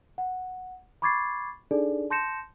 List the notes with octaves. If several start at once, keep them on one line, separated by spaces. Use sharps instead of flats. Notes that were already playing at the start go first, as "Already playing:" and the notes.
F#5
B5 C#6 D6 G#6 A6 C7
D4 D#4 G#4 A4 D5
A5 C6 G6 A#6 C#7 E7